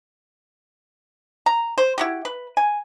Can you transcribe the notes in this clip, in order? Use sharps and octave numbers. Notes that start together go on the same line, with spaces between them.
A#5
C5
E4 F#4 G4
B4
G#5